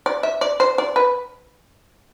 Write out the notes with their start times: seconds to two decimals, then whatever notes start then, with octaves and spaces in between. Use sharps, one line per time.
0.06 D5
0.23 E5
0.41 D5
0.60 C5
0.78 D5
0.96 B4